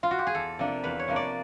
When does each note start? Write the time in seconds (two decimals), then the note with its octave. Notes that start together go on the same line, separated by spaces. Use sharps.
0.03 F4
0.11 F#4
0.19 G4
0.27 G#4
0.35 E2 A4
0.59 C3 F3 A#3 D4
0.84 E2 B4
0.99 C#5
1.08 C3 F3 A#3 D4
1.16 D5